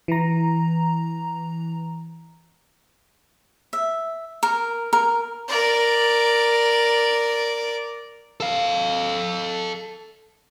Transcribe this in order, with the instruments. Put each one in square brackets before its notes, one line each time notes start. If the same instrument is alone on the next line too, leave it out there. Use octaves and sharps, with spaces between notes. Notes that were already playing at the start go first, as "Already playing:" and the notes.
[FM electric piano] E3 A#5
[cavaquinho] E5
A#4
A#4
[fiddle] A#4 D5
[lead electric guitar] A4 F5